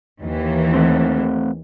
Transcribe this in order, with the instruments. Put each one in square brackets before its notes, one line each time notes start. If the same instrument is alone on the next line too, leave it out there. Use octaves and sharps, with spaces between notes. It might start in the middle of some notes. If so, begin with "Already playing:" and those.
[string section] D#2 E3
[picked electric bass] A3 C4